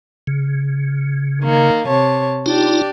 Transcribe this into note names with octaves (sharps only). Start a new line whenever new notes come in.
C#3
D#3 A#3
C3 C#5 A5
D4 D#4 F4 G4 D5